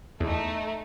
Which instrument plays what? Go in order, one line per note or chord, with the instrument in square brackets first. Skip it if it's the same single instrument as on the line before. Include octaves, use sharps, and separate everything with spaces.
[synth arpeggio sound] E2 [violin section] A3 D#4